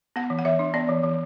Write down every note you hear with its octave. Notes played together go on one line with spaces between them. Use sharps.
B3 F#5
E3
F#5
E3 E5
D4
B3 D5
E3
E3